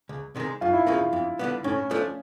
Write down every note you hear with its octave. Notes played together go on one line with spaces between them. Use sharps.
C#2
C3 D#3 G#3
F#2 F4
E4
C#3 F3 A#3 D#4 F4
F2
D3 G3 B3
A2 C#4
F3 A3 D4